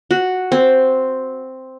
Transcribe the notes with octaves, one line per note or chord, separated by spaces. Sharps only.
F#4
C4